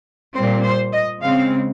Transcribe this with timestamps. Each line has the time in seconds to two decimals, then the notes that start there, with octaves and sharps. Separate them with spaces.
0.35 A#2 G3 C4 C5
0.64 C5
0.92 D#5
1.22 C#3 G#3 C4 F5